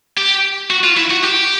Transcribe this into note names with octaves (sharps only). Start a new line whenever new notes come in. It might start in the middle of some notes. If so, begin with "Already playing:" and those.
G4
F#4
F4
E4
F#4
G4